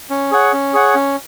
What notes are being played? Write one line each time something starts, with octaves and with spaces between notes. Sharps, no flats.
C#4
G#4 C#5 F#5
C#4
G#4 C#5 F#5
C#4